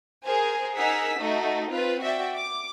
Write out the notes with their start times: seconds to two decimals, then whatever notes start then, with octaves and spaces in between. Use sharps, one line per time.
0.23 G#4 A#4 C5 G#5
0.76 D#4 G#4 A#4 F#5 E6 B6
1.19 A3 D#4 F#4 D#5
1.69 C4 F4 B4
2.01 F#4 D5 E5 G5
2.36 D6